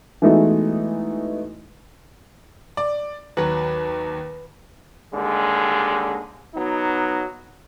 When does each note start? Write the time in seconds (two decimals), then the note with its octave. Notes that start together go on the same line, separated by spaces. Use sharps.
0.22 E3 G#3 A3 B3 D#4 F#4
2.77 D5
3.37 D#2 F#3 B4
5.13 D#2 D3 G3 G#3
6.54 F#3 B3 D#4